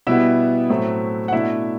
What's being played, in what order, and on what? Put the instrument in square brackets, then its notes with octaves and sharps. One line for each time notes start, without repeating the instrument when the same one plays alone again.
[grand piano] B2 G3 B3 E4 E5
A2 F#3 A3 C4 E4
F#5
B2 A3 D4 E4 E5